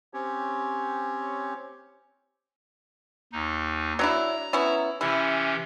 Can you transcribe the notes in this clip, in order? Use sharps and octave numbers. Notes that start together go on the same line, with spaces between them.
C4 C#4 G4 C#5
D#2 D#4
F#3 D4 E4 A#5
B3 C#4 E4
C3 E3 C#4 E4